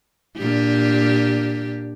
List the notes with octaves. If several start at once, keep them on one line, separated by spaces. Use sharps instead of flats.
A#2 D4 G4